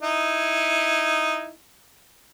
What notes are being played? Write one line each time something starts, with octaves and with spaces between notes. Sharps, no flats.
D#4 E4